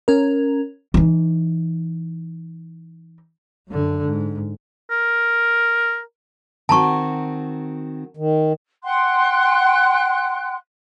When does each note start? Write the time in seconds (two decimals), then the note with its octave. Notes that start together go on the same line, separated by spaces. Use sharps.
0.08 C#4 A#4
0.94 E3 D#4
3.68 F#2 D3
4.06 G#2
4.91 A#4
6.69 D#3 C4 F#4 A5 A#5 C#6
8.17 D#3
8.84 F#5 G5 C6 F#6